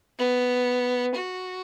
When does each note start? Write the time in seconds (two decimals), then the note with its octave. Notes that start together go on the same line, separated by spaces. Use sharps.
0.19 B3
1.15 F#4